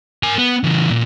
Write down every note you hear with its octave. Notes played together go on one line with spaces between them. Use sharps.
A#4 G#5
B3
C#3 E3
A#2